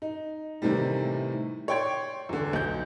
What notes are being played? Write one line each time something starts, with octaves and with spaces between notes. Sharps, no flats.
D#4
A2 C3 D#3 E3 G3
C#5 D5 G5 C6 G#6
E2 D3
B1 G6